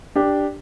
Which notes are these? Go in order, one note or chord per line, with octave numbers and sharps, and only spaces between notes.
D4 G4